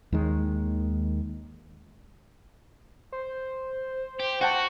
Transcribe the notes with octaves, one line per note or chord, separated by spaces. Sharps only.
D#2 D#3 G#3
C5
G4
F#4 F#5 G5 A5